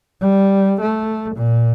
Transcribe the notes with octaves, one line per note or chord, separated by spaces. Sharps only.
G3
A3
A#2